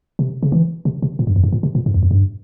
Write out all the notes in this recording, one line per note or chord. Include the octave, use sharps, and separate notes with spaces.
C3
C#3
E3
C3
C3
A#2
G2
F2
G#2
A#2
C3
A#2
G#2
E2
F2
G2